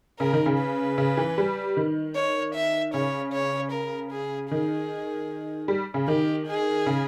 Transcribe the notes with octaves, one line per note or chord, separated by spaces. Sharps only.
C#3 A#4
D#3
C#3
B4
C#3
E3
G3
D#3
C#5
E5
C#3 C#5
C#5
A#4
G#4
D#3 G#4
G3
C#3
D#3 G4
G#4
C#3